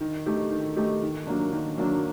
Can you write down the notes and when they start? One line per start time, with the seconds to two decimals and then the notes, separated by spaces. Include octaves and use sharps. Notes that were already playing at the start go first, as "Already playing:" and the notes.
0.01 D#3
0.26 A3 D#4 G4
0.51 D#3
0.76 A3 D#4 G4
1.02 D#3
1.27 F#3 A#3 D4
1.53 D#3
1.78 F#3 A#3 D4